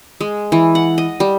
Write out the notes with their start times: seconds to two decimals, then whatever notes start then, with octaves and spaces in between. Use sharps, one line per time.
0.21 G#3
0.52 E3
0.75 F#5
0.98 D#5
1.20 G3